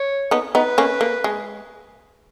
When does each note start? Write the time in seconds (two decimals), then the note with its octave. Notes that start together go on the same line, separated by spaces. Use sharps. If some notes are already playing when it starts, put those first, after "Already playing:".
Already playing: C#5
0.31 B3 D#4
0.55 B3 D#4 B4
0.78 A#3 C#4
1.01 A#3
1.24 G#3